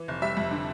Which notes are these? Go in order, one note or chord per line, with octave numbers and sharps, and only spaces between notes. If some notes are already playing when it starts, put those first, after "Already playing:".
Already playing: E3
F1
G3 E5
F2
D3